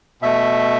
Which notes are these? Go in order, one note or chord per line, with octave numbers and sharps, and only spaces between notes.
B2 A3 E5